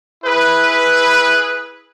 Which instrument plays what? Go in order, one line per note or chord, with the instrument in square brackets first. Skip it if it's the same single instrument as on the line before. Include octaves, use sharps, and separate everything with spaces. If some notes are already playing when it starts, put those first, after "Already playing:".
[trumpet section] E4 G#4 B4